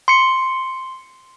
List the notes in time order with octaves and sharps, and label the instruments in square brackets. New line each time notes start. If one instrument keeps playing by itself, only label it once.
[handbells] C6 C#7